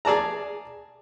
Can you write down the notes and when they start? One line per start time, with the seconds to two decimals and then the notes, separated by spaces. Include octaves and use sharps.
0.05 G#4 D5 A5 A#5